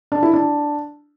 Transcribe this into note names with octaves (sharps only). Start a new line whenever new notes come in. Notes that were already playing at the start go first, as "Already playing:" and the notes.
D4
E4
D4